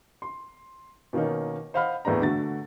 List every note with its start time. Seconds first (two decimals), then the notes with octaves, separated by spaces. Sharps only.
0.22 C6
1.13 B2 D#3 A#3 C#4 D#4
1.74 C5 D#5 F5 F#5 B5 F6
2.05 E2 A2 B3 D4 A#5
2.22 D3 A3 F#4 A6